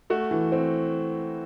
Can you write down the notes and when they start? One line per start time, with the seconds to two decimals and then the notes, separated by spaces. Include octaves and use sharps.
0.10 A3 F#4
0.31 E3
0.52 C4